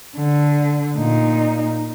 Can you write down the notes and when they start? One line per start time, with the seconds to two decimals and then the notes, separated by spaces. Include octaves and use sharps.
0.17 D3
0.96 A#2 D#4